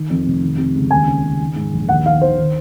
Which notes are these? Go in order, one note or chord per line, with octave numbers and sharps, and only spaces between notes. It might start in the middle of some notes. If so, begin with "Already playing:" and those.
Already playing: D#3
F2
F1
D#3
C3
C#2
D#2 G#5
C#3
C#3
D#3
G#2
A#1
D#2 F#5
D#3 F5
D#3 C5
D#3